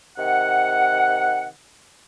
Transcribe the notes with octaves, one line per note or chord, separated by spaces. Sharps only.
C3 D#3 F#5